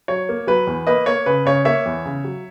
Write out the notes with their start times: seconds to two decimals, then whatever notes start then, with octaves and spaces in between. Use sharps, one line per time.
0.08 F#3 C#5
0.29 A#3
0.47 F#3 B4
0.67 E2
0.87 A#3 B4 D#5
1.06 A#3 C#5
1.26 C#3 B4
1.45 C#3 C#5
1.65 A#3 C#5 E5
1.86 E2
2.05 C#3
2.24 F#3